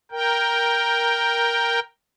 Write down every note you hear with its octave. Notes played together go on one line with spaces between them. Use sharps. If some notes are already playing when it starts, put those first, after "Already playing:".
A#4 G5